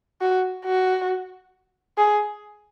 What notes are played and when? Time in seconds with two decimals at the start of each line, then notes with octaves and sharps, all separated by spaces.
0.21 F#4
0.65 F#4
1.98 G#4